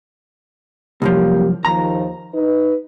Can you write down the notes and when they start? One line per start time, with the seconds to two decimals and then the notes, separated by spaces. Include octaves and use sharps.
1.02 C2 F#2 F3 A#3 G4
1.65 D#2 D#3 F3 A#5
2.33 D#4 B4